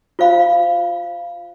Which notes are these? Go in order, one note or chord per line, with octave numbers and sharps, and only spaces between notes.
F4 C5 F5 B5